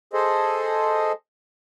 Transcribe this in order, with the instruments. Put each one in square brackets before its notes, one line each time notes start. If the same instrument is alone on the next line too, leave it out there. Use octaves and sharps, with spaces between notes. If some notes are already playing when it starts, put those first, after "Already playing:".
[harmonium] G#4 A4 C5 D#5